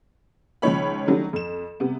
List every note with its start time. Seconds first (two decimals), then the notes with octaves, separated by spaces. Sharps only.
0.62 C#2 D#3 F3 D#4 C#5 B5
1.07 D#3 F#3 G3 A3 C#4 D4
1.33 F2 E7
1.80 C3 G3 B3